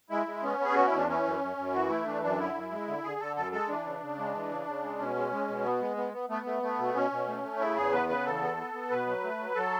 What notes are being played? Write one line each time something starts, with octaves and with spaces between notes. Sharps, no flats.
G#3 E4
G#3
B3 C#4
B3 G#4
B2 F#4
E4
E2
D4
E3 C#4
F#2
F#2
F#2
E3 F#4
A3 E4
E3 D4
F#2 D4
D3 E4
F#2
G#3
D3
D3 G#4
D3 A4
F#2 A4
G#3 A4
E3 D4
C#3
C#3
G#3
E3
C#3
C#3
G#3
B2 C#4
G#3
G#3
B2
B3
G#3
B3
B3
A3 B3
A3
A3
B2
B2 C#4
B2
A3
A3
C#3 E4
E2 G#4
B3 B4
C#3 B4
E2 A4
B3
B3
B3
B2 B4
F#3
A3
F#3
F#3 A4